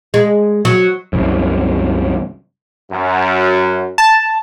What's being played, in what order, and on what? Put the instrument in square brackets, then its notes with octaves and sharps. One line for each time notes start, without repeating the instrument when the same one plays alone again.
[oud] G#3
F#3
[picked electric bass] C2 F#2
[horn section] F#2
[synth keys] A5